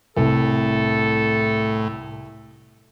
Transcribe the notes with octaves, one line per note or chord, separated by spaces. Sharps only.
C2 A2 A4